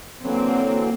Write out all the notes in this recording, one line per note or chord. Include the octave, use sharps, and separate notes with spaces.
D3 E3 F#3 A#3 C4